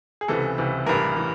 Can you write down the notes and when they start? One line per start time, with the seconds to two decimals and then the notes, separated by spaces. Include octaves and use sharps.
0.21 G#4
0.28 C#2 C3 E3 A4
0.58 C#2 C3 E3
0.86 A1 G2 E3 A#4
1.17 E3